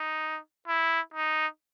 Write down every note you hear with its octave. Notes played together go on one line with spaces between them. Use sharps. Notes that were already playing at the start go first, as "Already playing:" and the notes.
Already playing: D#4
E4
D#4